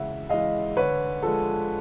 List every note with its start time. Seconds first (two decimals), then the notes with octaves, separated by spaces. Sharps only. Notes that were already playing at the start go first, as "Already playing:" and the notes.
Already playing: C#3 E3 G#3 E5 F#5
0.29 E3 G#3 D#5 F5
0.77 D3 B4 C#5
1.23 F3 G#3 A4